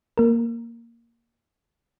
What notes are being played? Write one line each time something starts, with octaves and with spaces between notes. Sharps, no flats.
A#3 A#4